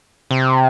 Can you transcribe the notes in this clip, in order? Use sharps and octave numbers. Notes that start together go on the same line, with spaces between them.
C3